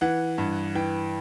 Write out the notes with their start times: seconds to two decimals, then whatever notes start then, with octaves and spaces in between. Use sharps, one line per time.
0.01 E3 F#5
0.38 G2
0.75 E3 G5